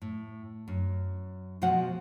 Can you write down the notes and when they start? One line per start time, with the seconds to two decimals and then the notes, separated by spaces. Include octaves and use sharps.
0.02 A2
0.68 F#2
1.62 B2 F3 G#3 F#4 F#5